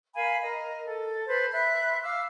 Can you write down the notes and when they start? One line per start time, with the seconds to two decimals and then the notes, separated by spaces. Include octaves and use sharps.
0.15 A#4 F5 G#5 B5
0.42 A#4 D#5
0.85 A4
1.27 B4 C5 A5
1.52 E5 B5 C6 F#6
2.03 F5 D6 E6